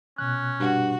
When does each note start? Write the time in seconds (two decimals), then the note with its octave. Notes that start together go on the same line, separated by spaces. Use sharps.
0.18 B2 C#4 F#6
0.60 G2 F#4